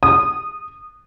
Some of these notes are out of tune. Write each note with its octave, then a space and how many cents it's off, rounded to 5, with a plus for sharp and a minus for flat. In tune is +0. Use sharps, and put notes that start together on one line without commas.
D#6 -15